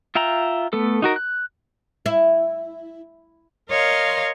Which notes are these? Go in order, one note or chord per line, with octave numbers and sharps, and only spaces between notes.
F4 E5 G5 A#5
A3 B3 A4
D#4 F#4 A#4
F#6
E4
A#4 C#5 D#5 F5 C6